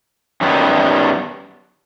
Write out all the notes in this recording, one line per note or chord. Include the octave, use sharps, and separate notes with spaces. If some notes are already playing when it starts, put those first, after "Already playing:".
F#2 D#3 G3 B3